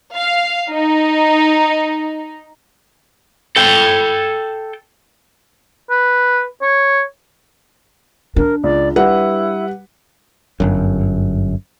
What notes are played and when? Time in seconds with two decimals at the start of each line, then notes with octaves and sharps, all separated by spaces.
0.14 F5
0.71 D#4
3.56 A4 G5
5.90 B4
6.62 C#5
8.36 D4 A#4
8.64 C#2 D5
8.96 G3 E4 B4 F#5
10.60 G1 F#2